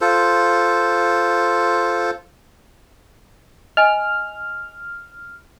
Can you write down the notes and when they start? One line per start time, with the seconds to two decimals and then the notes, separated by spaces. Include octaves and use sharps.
0.01 F4 A4 C5
3.77 D#5 G#5 F6